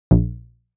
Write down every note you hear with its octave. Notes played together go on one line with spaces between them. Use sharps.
A#1